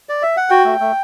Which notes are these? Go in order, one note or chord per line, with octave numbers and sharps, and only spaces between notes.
D5
E5
F#5
F#4 G5
A3
A3